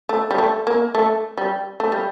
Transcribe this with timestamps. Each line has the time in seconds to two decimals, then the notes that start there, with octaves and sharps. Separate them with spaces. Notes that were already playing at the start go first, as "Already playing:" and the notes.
0.09 A3
0.31 G3
0.38 A3
0.67 A#3
0.95 A3
1.38 G3
1.80 A3
1.92 G3